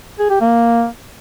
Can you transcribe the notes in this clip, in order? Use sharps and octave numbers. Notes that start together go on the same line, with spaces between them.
G#4
G4
A#3